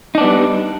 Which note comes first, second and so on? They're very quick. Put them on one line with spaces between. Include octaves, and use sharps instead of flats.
D#4 D4 B3 G3